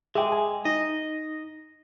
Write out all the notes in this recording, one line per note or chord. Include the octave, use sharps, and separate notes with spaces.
G#3 G#4 E5 G5 D6
G#5
D#4 D#5